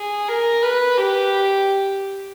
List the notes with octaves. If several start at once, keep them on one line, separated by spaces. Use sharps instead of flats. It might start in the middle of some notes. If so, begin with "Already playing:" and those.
Already playing: G#4
A#4
B4
G4